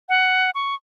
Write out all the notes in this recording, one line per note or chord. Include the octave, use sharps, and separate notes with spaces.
F#5
C#6